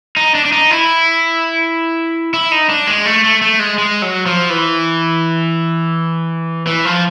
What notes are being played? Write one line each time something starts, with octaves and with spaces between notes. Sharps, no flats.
D#4
D4
D4
D#4
E4
E4
D#4
D4
G#3
A3
A3
A3
G#3
G#3
F#3
F3
E3
E3
F3